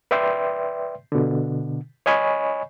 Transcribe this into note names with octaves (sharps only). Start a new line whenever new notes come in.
B4 D5 E5 G5 C6
B2 D3
C#5 D#5 G#5 B5 C#6